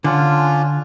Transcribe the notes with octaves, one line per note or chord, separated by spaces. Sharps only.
D3 C#4 D4 F4